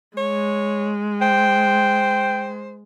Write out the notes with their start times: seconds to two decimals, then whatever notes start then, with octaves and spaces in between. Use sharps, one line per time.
0.17 G#3 C#5
1.22 C5 G5